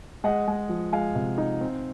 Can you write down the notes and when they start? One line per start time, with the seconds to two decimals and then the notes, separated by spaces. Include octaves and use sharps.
0.24 G#3 D#5 F#5
0.48 G#3
0.69 F3
0.92 G#3 F5 G#5
1.15 C3
1.38 D#4
1.61 C4